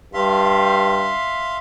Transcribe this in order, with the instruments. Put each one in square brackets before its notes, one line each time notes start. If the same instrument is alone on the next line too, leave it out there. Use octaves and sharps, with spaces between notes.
[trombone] G2 [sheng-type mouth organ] E5 F5 C6